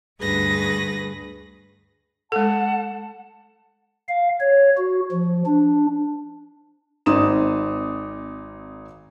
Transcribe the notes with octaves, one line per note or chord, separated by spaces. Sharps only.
D2 G2 G#4 B4 A#6
G#3 A4 F#5 A5
F5
C#5
F#4
F3
D4
G#1 C4 D#4 D#6 E7